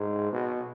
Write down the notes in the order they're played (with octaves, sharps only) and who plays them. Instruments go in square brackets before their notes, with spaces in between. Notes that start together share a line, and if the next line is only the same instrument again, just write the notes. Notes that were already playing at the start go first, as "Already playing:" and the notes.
Already playing: [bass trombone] G#2
B2